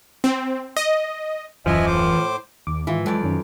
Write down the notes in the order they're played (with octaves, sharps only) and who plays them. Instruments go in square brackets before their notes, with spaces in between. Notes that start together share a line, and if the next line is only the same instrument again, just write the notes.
[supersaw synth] C4
D#5
[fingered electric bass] D#1 F#2 [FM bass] E3 [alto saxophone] F3 [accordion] D#5 E5 G#5
[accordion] A2 C5 D6
[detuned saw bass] D#2 [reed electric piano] D#3 [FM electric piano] D6
[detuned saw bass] G#2 [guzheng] E3 [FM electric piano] E4 F4
[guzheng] F2 D5 [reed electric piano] F#3 [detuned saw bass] G#3
[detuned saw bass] F#2 [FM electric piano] D#3 C#4